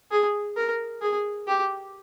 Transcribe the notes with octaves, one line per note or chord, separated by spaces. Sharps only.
G#4
A#4
G#4
G4